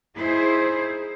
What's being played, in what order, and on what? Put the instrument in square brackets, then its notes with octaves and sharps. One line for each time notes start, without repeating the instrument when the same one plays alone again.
[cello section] D#4 E4 G#4 C5